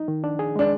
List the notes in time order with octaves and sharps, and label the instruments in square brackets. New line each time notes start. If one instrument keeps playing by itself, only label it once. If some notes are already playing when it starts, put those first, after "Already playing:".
Already playing: [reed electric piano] D#4
D#3
D4
G#4
[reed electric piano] G#3 [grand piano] D4